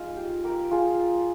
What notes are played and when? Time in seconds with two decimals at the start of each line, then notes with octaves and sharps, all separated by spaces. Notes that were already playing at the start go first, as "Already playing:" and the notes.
Already playing: G#3 D#4 F4
0.17 G4
0.44 G4 A#4
0.71 F4 G#4